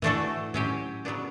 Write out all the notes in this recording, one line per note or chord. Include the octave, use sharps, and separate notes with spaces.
A2 E3 A3 D4 F#4 A4
A2 F#3 C#4 G4
C#3 F#3 B3 D4